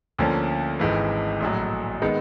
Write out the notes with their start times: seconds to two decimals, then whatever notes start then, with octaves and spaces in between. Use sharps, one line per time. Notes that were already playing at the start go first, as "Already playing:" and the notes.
0.19 D2 D3 F3 A#3 C#4
0.79 G#1 G#2 E3
1.40 A#1 A2 F#3
2.02 D#3 G#3 B3 D#4